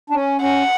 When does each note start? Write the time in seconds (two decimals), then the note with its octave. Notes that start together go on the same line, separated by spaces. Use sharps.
0.10 D4
0.14 C#4
0.41 C#4 F#5